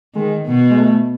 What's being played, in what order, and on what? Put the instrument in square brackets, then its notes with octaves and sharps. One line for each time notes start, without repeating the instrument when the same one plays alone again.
[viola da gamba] D#3 [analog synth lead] G#3
[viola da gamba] B2
[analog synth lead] G#3
A3